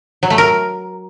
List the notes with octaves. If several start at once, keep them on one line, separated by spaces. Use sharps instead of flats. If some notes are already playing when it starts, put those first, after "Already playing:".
F#3
A3
A#4